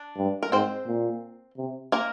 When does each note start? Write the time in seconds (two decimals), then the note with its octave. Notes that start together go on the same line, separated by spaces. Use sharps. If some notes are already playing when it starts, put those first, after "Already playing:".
Already playing: D4
0.17 G2
0.43 A#4
0.52 G#2 C4 C5
0.87 A#2
1.58 C3
1.92 A#3 A#4